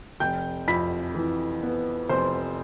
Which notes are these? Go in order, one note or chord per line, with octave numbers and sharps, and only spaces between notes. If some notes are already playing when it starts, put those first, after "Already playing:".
F1 G5 G6
F2 B5 B6
E3
B3
F1 C5 C6